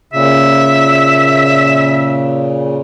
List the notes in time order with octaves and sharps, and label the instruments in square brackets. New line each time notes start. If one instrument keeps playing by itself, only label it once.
[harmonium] A#2 C#3 [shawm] E5